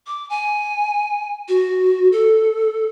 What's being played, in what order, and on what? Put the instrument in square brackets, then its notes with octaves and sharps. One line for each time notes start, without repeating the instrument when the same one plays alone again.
[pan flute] D6
G#5
F#4
A4